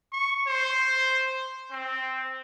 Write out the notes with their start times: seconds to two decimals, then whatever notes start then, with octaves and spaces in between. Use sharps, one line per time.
0.12 C#6
0.47 C5
1.71 C4